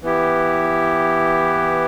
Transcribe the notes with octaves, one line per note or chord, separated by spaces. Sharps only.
E3 B3 E4 G4